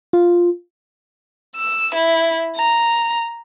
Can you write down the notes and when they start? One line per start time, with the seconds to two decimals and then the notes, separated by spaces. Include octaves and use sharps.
0.13 F4
1.56 E6
1.94 E4
2.56 A#5